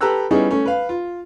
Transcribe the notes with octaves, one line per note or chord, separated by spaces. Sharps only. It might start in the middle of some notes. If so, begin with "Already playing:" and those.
G4 A4 B4 A#5 E6 F#6
G3 B3 C#4 D#4 E4 G#4
A3 C#4
B4 F5
F4